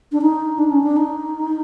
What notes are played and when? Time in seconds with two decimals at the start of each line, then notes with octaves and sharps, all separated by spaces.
0.12 D4
0.21 D#4
0.58 D4
0.72 C#4
0.83 D4
0.96 D#4